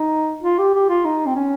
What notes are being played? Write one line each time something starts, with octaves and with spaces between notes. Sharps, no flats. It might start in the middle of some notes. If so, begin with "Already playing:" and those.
Already playing: D#4
F4
G4
G4
F4
D#4
C4
C#4